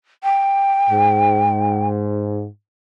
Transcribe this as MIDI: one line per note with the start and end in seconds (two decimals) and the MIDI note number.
0.23 1.87 79
0.90 2.46 44